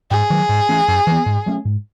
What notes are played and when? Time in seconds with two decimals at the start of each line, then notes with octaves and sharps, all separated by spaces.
0.11 G#2 G#4
0.30 D#3 F#3
0.49 G#2
0.69 E3 A3 C#4
0.88 F#2
1.07 E3 B3
1.26 G#2
1.46 F#3 A3 C#4
1.65 G#2